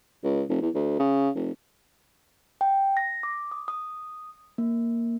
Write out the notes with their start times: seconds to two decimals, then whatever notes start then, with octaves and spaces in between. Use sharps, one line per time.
0.24 C#2
0.49 F1
0.62 E2
0.75 D2
0.99 C#3
1.36 F1
2.61 G5
2.97 A#6
3.23 D6
3.52 D#6
3.68 D#6
4.58 A#3